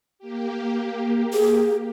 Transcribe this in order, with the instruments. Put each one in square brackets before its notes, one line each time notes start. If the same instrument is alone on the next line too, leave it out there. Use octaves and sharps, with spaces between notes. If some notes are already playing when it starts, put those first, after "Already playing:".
[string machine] A#3 G4
[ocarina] G#4